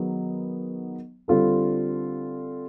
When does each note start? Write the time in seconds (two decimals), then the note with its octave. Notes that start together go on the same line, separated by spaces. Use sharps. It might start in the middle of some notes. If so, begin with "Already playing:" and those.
Already playing: D#3 F#3 B3 D#4 G#4
1.28 D3 G3 C4 F4 A4